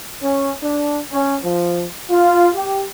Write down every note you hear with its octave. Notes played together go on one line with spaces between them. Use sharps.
C#4
D4
C#4
F3
F4
G4